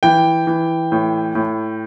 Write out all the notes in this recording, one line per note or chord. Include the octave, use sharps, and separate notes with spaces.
E3 G5
E3
A2
A2